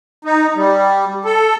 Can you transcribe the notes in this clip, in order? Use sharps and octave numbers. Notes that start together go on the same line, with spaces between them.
D#4
G3
A4